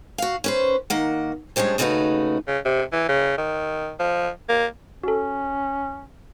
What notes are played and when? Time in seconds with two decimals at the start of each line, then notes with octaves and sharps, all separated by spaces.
0.18 F#4 F5
0.44 C#4 B4 C5
0.90 D#3 A#3 F#5
1.56 F3 G3 G#3 C#4 D4
1.78 D#2 C#3 A3 D#4 F#4 B4
2.48 C#3
2.65 C3
2.93 E3
3.09 C#3
3.38 D#3
4.00 F3
4.49 A#3
5.03 C#4 F#4 A4